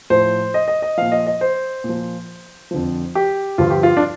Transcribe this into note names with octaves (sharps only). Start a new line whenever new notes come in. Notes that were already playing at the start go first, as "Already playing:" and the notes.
A2 F3 C5
D#5
D#5
D#5
A#2 F3 F5
D#5
D#5
C5
A#2
F3
F2 D3 F3
G4
G2 D3 F3 F4
G4
F4
D4